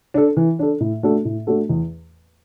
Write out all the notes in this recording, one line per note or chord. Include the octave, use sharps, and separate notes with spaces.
D4 A4
E3
D4 A4
A2
A3 D4 F#4 A4
A2
A3 D4 F#4 A4
E2